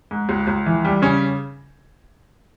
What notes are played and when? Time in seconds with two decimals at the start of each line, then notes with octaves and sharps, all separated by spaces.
0.11 G#2
0.29 C#2
0.47 C#2
0.66 E3
0.85 G3
1.02 C#3 C#4